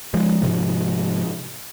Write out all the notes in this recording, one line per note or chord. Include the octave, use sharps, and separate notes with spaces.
F3 G#3
G#2 C3 F3